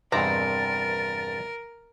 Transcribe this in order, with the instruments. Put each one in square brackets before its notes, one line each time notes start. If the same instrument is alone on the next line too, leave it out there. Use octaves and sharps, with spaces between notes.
[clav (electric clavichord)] E2 G2 C3 [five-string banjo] D#3 C4 A#5 [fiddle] A#4 [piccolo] A6